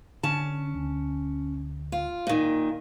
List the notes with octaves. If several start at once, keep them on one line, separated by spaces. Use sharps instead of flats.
D3 C#4 A5
D2
F4
A#2 D#3